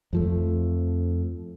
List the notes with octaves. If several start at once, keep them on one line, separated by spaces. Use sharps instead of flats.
F2 F3 A3